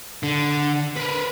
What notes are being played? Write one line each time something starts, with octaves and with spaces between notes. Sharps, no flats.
D3
A#4 B4